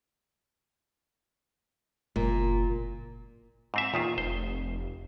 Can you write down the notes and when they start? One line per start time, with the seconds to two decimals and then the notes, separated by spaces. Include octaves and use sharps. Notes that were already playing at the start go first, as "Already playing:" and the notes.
2.16 F#1 A#2
3.74 G#2 C4 E5
3.94 E2 A#2 D#3 F4
4.18 F1 C5